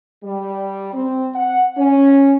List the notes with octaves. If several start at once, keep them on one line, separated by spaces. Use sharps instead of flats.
G3
C4
F#5
C#4